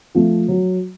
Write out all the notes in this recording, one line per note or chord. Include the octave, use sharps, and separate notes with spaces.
F3 A3
F#3